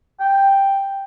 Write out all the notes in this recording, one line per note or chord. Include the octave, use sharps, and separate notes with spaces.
G5